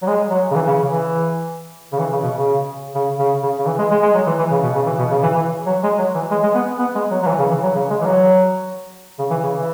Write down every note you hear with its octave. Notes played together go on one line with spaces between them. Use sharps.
F#3
G#3
F#3
C#3
E3
C#3
C#3
E3
C#3
E3
C#3
B2
C#3
C#3
C#3
C#3
C#3
E3
G#3
G#3
G#3
F#3
E3
E3
C#3
B2
C#3
E3
B2
C#3
E3
E3
F#3
G#3
F#3
E3
G#3
G#3
B3
B3
G#3
F#3
F#3
E3
C#3
E3
F#3
C#3
G#3
E3
F#3
C#3
E3
C#3
E3